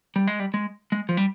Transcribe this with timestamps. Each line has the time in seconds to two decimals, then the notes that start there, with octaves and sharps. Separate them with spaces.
0.16 G3
0.27 G#3
0.40 G3
0.54 G#3
0.92 G#3
1.09 F3
1.17 G3